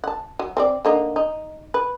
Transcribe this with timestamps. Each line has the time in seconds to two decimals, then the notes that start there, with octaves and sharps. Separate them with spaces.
0.04 F#5 A5
0.39 F#3
0.57 C4 A4 D5
0.85 D3 A#3 D#4
1.16 D#4
1.74 B4